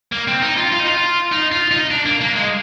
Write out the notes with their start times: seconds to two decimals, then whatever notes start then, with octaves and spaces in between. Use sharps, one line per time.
0.12 A#3
0.28 C4
0.42 D#4
0.57 F4
0.72 F4
0.80 D#4
0.87 F4
1.32 D#4
1.52 F4
1.71 D#4
1.91 D4
2.06 A#3
2.21 A#3
2.36 G#3